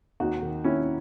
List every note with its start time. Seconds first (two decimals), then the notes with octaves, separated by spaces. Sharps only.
0.20 D#2 D#4 F#4
0.42 D#3
0.64 D#2 C#4 E4